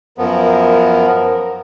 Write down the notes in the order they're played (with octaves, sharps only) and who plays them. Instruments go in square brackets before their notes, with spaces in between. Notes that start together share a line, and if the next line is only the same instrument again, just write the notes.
[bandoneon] F#2 F3 B3 [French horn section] A#4